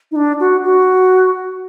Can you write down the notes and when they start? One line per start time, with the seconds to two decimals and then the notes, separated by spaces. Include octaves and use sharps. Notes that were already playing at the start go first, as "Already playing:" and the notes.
0.12 D#4
0.16 D4
0.40 F#4
0.64 F#4